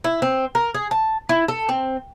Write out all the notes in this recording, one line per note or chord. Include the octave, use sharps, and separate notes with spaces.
E4
C4
A#4
G#4
A5
E4
A4
C4